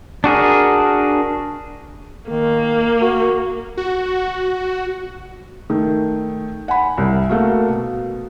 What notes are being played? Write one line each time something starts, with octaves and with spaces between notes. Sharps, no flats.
D4 F#4 G#4 A#4
D#3 A#3
F#4
F#4
D#3 A3
F#5 G#5 B5
C2
A3 A#3 F#4
B2